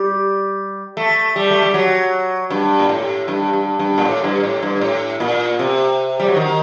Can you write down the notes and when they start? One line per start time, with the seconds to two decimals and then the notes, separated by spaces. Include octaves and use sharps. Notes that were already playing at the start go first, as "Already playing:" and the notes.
Already playing: G3
0.97 A3
1.36 G3
1.51 A3
1.62 G3
1.74 F#3
2.50 G2
2.79 A#2
2.89 A2
3.28 G2
3.53 G2
3.79 G2
3.98 A#2
4.05 A2
4.24 G2
4.43 A2
4.63 G2
4.81 A2
5.20 A#2
5.59 C3
6.20 G3
6.28 F#3
6.36 D#3